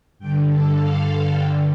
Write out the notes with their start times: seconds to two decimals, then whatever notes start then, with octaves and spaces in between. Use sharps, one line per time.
0.19 G2 D3 G5
0.48 A4
0.75 F5
1.32 G2 D3 G5